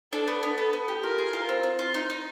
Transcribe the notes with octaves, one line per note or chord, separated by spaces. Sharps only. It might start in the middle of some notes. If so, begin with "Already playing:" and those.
D4 A4
B3
B3
B3 A4
B3
G4
F4 A#4
G#4
F4
C4
C4
F4
D#4
D#4